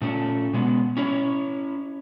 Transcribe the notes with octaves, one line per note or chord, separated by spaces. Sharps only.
A#2 A3 C#4 A4
B2 G#3 B3
C#4 E4 C#5